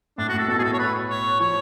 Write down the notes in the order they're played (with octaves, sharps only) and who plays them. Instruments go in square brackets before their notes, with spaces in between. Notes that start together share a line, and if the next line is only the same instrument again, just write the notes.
[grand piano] A2 [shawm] D4
[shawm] F#4
[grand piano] A2 [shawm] A4
[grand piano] B2 [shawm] A4
[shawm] G#4
[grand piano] A2 [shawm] A4
[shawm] C#5
B4
C#5
[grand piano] F3 [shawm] C#5